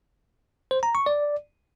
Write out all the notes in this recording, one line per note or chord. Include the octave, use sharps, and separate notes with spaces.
C5
A#5
C#6
D5